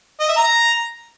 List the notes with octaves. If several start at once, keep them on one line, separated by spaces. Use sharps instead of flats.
D#5
E5
A#5